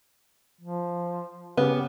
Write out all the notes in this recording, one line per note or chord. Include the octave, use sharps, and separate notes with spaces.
F3
C#3 B3 G4